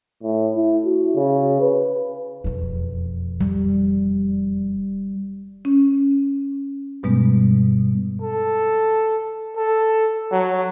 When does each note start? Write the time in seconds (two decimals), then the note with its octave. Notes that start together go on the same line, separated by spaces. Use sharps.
0.23 A2
0.55 E4
0.85 F#4
1.15 C#3
1.60 B4
2.44 E1 F2
3.41 G3
5.65 C#4
7.03 G2 B2 G3 G#3 B3
8.22 A4
9.56 A4
10.32 F#3